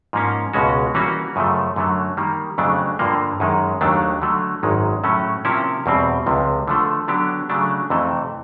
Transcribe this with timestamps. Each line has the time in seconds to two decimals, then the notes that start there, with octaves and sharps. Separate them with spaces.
0.13 G#2 F3 A#3 C#4
0.53 C#2 B2 G#3 C#4 F#4
0.94 E3 G3 A#3 C#4 F#4
1.36 F#2 C#3 F3 A3
1.76 F#2 D3 F#3 A3
2.17 D#3 G3 A#3
2.58 F2 C#3 F#3 A3 D4
2.99 G2 D3 F3 A#3
3.40 F#2 D#3 G#3
3.81 D#2 D#3 F#3 A3 D4
4.22 D3 F#3 A3
4.63 G#1 F#2 D#3 G#3
5.04 A2 F#3 A3 C#4
5.45 C3 F3 A#3 C#4 E4
5.86 E2 B2 G3 C4
6.26 C#2 C3 F3
6.68 D3 F3 A3
7.08 D3 F#3 B3 D4 G4
7.49 C#3 F#3 A3 D4
7.90 F2 C3 E3 A3